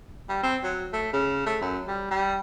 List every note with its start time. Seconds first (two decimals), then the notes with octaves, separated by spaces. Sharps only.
0.29 G3
0.43 C4
0.63 F#3
0.93 A3
1.13 C#3
1.46 A3
1.61 F#2
1.88 G3
2.11 G3